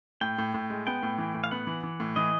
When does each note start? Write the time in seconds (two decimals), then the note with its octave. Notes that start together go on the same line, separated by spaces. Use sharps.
0.21 A2 G5
0.38 A2
0.54 A2
0.70 G#3
0.87 B3 G5
1.03 A2
1.18 E3
1.35 A2
1.44 F5
1.51 B3 F#5
1.67 E3
1.83 E3
2.00 A2
2.16 E3 D#5